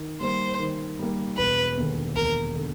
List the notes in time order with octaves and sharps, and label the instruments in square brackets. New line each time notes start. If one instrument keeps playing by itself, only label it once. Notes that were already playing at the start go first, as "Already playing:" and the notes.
Already playing: [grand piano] D#3
[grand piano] G3 A#3 [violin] C5
[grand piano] D#3
G3 A#3
[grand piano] E1 [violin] B4
[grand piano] D#2 D3
[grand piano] E1 [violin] A#4
[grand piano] D3